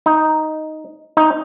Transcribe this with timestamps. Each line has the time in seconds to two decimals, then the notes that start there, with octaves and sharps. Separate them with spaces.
0.06 D#4
1.17 D#4